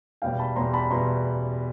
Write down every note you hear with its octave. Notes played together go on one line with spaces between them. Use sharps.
E2 B2 G3 F5 G5
A5 B5
E2 B2 G3 A#5 C6
A5 B5
E2 B2 G3 A#5 C6